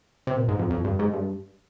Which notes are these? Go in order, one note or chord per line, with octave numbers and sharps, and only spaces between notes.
C3
A#2
G#2
F2
F2
G2
G#2
G2